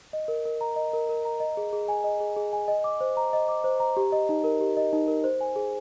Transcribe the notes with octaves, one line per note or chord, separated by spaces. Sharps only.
D#5
A#4
A#4
A#5
D#5
A#4
A#4
A#5
D#5
G#4
G#4
G#5
D#5
G#4
G#4
G#5
D#5
D6
C5
A#5
D#5
D6
C5
A#5
G4
D#5
D#4
A#4
G4
D#5
D#4
A#4
C5
G#5
G#4